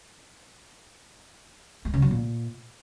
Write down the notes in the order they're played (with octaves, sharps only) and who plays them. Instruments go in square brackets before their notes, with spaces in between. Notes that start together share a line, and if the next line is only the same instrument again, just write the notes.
[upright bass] G#3
C#3
F#3
A#2